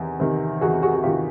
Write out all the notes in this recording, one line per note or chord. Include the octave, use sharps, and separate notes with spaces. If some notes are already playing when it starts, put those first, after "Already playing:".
Already playing: E2 C3 D#3
C3 D#3
E2 F#4 G#4
F#4 G#4
F#4
C3 D#3 F4 G4